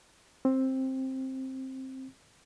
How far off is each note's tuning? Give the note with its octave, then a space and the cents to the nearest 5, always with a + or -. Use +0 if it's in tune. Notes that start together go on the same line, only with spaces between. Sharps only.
C4 +10